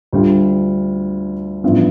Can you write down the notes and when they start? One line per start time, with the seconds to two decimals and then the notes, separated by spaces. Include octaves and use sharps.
0.13 D2 D3 G3 D4 F4
1.64 A1 G2 F3 B3 E4